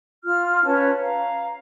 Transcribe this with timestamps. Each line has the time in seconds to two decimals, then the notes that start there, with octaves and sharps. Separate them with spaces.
0.24 F4 F6
0.65 C#4 B4 C#5 A5
1.00 F5 A#5